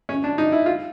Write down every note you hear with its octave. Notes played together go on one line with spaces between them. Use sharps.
C#4
D4
D#4
E4
F4